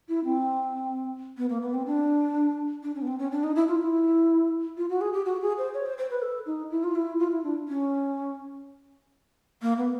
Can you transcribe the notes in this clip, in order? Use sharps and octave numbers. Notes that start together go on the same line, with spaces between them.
E4
C4
B3
A#3
B3
C4
D4
D4
C#4
B3
C4
C#4
D4
D#4
E4
F4
E4
F4
F#4
G#4
G4
F#4
G#4
C5
C#5
C5
C5
B4
A4
D#4
E4
F4
E4
F4
E4
D4
C#4
A#3
B3